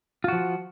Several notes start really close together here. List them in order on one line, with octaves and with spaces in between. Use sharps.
F4 F#4 F3